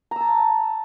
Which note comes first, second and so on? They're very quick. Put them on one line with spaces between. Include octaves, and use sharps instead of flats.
A#5 E6 A5